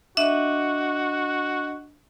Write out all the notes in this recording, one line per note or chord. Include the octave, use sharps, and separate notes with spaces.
D4 F#4 D#5 E5